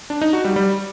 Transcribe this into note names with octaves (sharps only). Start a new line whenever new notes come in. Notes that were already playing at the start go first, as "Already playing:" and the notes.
D4
D#4
F#4
G3
G3